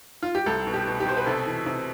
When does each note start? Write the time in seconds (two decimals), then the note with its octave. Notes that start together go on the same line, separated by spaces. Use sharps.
0.23 F4
0.35 G4
0.46 C2 A4
0.67 B2
0.74 G4
0.87 B2
1.00 G4
1.06 B2 C5
1.17 B4
1.26 C3 A4
1.46 E3
1.66 C3